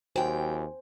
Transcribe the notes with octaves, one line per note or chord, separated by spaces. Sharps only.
D#2 F#3 C5 G5 G#5